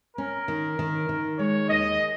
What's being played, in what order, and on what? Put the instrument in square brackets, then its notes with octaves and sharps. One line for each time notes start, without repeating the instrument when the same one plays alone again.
[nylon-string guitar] C#4 [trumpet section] A#4
[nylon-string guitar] D#3
D#3
D#3
[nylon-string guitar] G#3 [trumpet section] C#5
[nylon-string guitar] D#2 [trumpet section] D#5